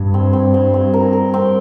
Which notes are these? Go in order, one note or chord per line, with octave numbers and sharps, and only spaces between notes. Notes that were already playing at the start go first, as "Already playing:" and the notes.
Already playing: G2
C4
C4
C4
C4
A#4
A#4
C4